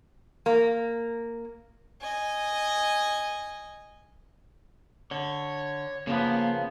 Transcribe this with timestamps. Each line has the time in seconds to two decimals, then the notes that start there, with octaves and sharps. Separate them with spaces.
0.46 A#3
2.01 D#5 G#5
5.11 D3 C#5
6.07 C#3 F3 A#3 B3